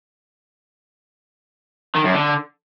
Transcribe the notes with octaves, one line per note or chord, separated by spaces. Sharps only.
D#3
F#2
D3